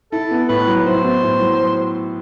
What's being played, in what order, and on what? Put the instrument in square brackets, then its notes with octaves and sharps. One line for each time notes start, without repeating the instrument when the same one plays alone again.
[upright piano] E4 [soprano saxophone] A4
[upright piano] B3
[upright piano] A2 [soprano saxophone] B4
[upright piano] F#3
[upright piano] E4 [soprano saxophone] C5
[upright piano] B3
A2
F#3